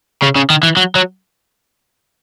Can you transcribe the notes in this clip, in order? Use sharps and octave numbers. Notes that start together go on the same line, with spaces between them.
C#3
C#3
D#3
E3
F#3
F#3